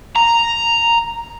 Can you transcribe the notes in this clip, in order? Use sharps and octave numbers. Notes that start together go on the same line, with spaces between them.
A#5